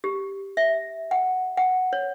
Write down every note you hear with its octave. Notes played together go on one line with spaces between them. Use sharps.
G4
E5
F#5
F#5
C#5